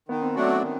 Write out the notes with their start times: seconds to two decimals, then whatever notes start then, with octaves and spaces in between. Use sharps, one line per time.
0.08 D#3 B3
0.22 C4
0.35 F#3 A3 C#4 D4 F#4
0.49 B3
0.62 D#3